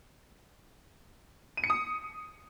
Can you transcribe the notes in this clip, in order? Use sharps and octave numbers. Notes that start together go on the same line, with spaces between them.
D#7
C#7
D#6